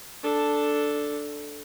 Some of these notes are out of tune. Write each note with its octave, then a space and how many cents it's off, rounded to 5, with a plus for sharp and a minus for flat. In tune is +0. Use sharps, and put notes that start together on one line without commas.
D4 +0 A4 +0